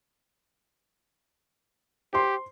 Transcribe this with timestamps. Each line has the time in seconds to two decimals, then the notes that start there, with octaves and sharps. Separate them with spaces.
2.13 G4 C5 C6